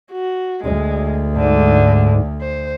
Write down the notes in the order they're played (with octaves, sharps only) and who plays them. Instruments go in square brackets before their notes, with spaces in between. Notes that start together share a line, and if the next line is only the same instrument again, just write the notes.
[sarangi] F#4
[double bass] D2 [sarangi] G#3
[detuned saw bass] G#2 [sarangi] D3
[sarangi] C5